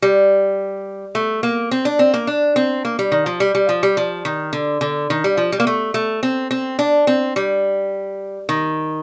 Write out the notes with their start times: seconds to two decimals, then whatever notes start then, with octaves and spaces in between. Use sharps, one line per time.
0.02 G3
1.15 A3
1.43 A#3
1.71 C4
1.85 D4
1.99 C4
2.14 A#3
2.27 D4
2.56 C4
2.85 A#3
2.99 G3
3.12 D#3
3.26 F3
3.40 G3
3.55 G3
3.69 F3
3.83 G3
3.97 F3
4.25 D#3
4.53 D3
4.81 D3
5.10 D#3
5.24 G3
5.37 F3
5.52 G3
5.60 A#3
5.67 A3
5.94 A3
6.23 C4
6.51 C4
6.79 D4
7.07 C4
7.36 G3
8.49 D#3